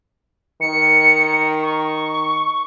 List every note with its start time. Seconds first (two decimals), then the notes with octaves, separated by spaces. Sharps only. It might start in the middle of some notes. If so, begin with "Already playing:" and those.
0.61 D#3 C#7
1.63 C#6